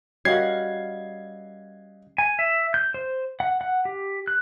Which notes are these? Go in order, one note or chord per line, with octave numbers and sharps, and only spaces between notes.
G3 C#4 F#4 A#4 D#5 F5 G#6 C7
G#5
E5
G6
C5
F#5
F#5
G4
F#6